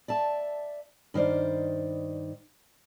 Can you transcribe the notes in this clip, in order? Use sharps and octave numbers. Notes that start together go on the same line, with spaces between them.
D5 E5 A5
G2 D#3 C5 D5